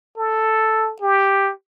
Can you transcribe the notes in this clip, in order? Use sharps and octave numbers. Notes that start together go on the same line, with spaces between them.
A4
G4